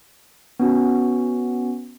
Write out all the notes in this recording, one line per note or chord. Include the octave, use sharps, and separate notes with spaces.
B3 C#4 F#4